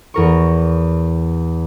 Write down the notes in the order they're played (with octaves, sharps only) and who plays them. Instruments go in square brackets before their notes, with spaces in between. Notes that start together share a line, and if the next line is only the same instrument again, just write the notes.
[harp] E2 A#4 C#6